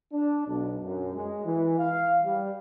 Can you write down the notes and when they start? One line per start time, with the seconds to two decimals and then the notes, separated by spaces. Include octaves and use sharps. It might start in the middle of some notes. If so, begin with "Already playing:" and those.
0.13 D4
0.47 B1
0.82 F#2
1.14 G#3
1.45 E3
1.78 F5
2.23 G3